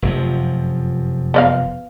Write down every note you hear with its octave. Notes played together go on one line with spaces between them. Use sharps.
F1 F#2 F3
B3 D5 F5